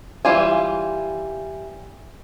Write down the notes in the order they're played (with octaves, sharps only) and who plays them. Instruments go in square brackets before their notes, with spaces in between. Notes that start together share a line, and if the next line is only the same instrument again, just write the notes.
[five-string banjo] E3 G3 F4 G#5